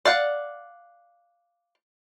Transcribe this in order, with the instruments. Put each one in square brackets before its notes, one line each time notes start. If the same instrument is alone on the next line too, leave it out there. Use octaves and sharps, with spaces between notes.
[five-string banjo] D5 F5 F#5